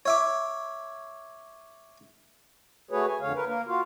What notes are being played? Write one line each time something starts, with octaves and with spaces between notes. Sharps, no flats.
C#5 E5 D6
A3 F#4 G#4 B4 C#5
G#5
F2 D3 C#5 F5
A#4 B4
A#3 A#4
F4 F#4 F5